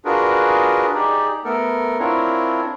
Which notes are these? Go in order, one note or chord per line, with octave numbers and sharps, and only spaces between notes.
D4 F4 F#4 G#4 A#4 B4
D#4 G4 G#4 D5
A3 B3 A4 A#4
C4 D4 E4 F4 A#4 C#5